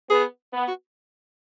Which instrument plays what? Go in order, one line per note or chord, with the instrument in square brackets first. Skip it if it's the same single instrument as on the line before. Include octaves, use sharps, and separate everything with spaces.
[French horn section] B3 [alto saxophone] G#4
[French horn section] B3
[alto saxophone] F#4